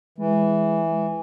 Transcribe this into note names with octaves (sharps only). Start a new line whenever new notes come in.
E3 G#3